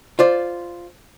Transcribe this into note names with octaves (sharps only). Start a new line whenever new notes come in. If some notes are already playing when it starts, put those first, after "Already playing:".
F4 C5 D5